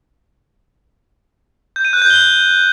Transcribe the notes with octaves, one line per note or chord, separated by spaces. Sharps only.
G6
D#7
F#6
G6
G7